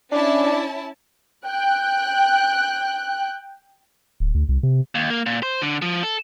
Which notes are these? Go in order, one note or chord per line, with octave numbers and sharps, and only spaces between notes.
C#4 D4 E4 A5
G5 F#6
D1
D2
C2
C3
D#2
A#3
A#2
C5
D3
F3
A4